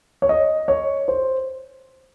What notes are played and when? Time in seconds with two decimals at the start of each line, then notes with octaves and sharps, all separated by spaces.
0.22 C#5
0.29 D#5
0.68 C#5
1.08 C5